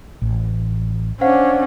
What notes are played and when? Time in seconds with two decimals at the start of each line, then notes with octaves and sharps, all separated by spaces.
0.22 A1
1.21 C#4 D4 C5 F5 F#5